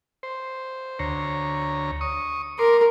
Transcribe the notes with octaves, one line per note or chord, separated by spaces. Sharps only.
C5
D2 C#5 A#5
C#6 D#6
A#4 C6 D6